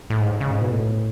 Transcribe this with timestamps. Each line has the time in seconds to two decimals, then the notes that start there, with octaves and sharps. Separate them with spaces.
0.10 A2
0.20 G#2
0.41 C#3
0.51 G#2
0.61 B2
0.71 A2